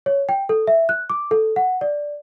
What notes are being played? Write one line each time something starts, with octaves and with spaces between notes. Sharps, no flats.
C#5
G5
A4
E5
F#6
D6
A4
F#5
D5